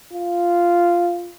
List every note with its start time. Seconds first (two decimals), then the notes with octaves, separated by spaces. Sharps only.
0.13 F4